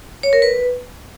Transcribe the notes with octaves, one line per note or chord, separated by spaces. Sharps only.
C#5
A#4
B4